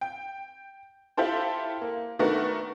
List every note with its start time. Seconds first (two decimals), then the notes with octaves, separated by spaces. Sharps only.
0.01 G5
1.17 E4 F4 G4 A4 C5
1.81 A#3
2.19 D#3 A3 B3 D4 F#4 A#4